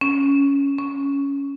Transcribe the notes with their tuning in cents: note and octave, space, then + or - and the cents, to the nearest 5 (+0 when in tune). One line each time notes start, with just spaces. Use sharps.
C#4 +5
C#4 +5